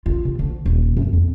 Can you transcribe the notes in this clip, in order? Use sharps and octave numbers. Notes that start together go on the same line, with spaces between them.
F4
C3
D2
D#1
F#2
F2